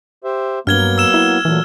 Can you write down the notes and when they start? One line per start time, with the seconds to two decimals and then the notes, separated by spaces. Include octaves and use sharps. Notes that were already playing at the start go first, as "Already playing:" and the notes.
0.24 G4 C5 E5
0.67 G2 F#3 A#3 B3 F6 G#6 G7
0.98 E6 E7
1.14 E4
1.45 A#2 E3 F#3 A3